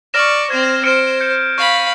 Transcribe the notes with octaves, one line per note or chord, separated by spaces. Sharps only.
D5 C#6 F6 A#6 E7
C4 C5 G#6
C5 F6 C#7 D7
G6 C#7
F5 B5 C#6